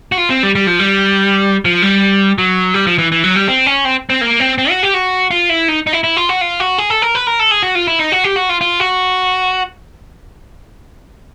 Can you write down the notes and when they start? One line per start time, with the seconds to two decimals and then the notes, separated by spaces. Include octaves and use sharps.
0.12 F#4
0.18 F4
0.30 C4
0.43 G3
0.55 G3
0.67 F3
0.79 G3
1.65 F3
1.82 G3
2.38 F#3
2.74 G3
2.87 F3
2.98 E3
3.12 E3
3.24 F#3
3.36 G3
3.48 C4
3.66 C#4
3.85 C4
4.10 C4
4.21 A#3
4.40 C4
4.58 C4
4.70 F#4
4.83 G4
4.94 F#4
5.31 F4
5.49 E4
5.68 D#4
5.87 D#4
5.93 E4
6.04 E4
6.17 F4
6.29 F#4
6.41 F4
6.60 F#4
6.78 G#4
6.90 A4
7.02 A#4
7.15 B4
7.27 A#4
7.39 A4
7.51 G#4
7.63 F#4
7.75 F4
7.87 E4
7.99 D#4
8.12 F#4
8.24 G4
8.36 F#4
8.49 F4
8.61 F4
8.80 F#4